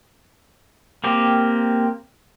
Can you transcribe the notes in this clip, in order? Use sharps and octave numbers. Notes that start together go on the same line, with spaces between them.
A#3 C4 G4